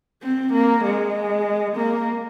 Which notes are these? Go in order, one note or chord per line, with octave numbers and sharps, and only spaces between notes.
C4
A#3
G#3
A#3